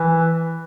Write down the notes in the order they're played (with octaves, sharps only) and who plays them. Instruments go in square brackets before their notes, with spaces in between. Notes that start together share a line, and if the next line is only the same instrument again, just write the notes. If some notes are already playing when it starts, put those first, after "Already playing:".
Already playing: [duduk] E3